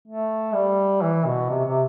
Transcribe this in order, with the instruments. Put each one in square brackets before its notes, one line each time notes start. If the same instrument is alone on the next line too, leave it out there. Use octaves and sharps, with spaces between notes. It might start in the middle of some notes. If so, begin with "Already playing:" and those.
[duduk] A3
G3
E3
B2
C3
C3